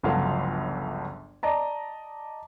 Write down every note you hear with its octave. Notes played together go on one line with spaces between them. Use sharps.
G1 C#2 F3 F#3 A4 F5
D5 D#5 A5 A#5